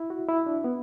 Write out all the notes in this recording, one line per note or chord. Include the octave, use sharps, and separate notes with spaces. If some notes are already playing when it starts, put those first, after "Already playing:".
Already playing: E4
F#4
E4
D4
B3